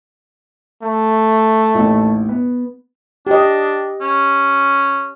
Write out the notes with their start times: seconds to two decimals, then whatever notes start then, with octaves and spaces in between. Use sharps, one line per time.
0.82 A3
1.75 A1 D#2
2.29 B3
3.27 D4 G4 D#5
4.01 C#4